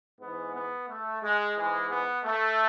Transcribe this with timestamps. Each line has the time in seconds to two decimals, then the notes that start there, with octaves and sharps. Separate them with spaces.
0.20 G#2 E3 B3
0.54 B3
0.88 A3
1.22 G#3
1.56 G#2 E3 G#3
1.90 B3
2.24 A3